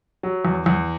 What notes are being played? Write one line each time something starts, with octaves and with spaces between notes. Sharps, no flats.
F#3
E2
E2